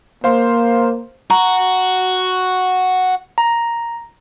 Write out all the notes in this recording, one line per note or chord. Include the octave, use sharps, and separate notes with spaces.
A#3 C5 F5 C6
F#4 A#5
A#5